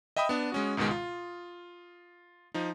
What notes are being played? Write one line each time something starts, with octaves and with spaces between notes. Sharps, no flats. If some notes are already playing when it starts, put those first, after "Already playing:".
D#5 E5 G5 B5 D#6
B3 D4
G#3 C#4 F#4
C#2 G#2 B2 D#3 G#3
F4
F3 D#4